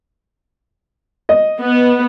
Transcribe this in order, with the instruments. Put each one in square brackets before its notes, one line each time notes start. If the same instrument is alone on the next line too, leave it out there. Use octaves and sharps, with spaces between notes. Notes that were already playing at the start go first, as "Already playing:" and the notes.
[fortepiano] D#5
[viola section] B3